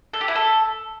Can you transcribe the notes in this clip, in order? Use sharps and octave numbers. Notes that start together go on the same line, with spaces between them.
A4
G4
E4
A4